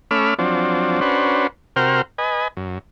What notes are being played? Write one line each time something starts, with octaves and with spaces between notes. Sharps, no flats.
A3 C#4 B5 D6 E6 F6
F3 F#3 C4 D4
C#4 D4 F#4 B4 C5
C3 F#4 A#4 C5 G5 F6
B4 D#5 G#5
F#2